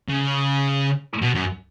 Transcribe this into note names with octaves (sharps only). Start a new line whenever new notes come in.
C#3
B2
F#2